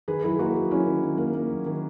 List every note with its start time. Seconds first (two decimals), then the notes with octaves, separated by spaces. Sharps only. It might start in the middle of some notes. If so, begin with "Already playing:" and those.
0.08 D#3 G#4 B4
0.23 F#3 E4 G#4
0.39 A#3 D#4 F#4
0.56 F#3
0.70 F#3 C#4 E4
0.86 D#3
1.03 D#3
1.18 A#3
1.34 A#3
1.49 F#3
1.66 D#3